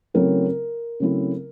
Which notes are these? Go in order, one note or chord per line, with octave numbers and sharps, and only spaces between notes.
C#3 F#3 A3 C4 E4 A#4
C#3 F#3 A3 C4 E4